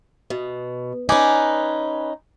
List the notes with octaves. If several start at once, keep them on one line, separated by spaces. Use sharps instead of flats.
B2
C#4 D#4 B4 D5 G#5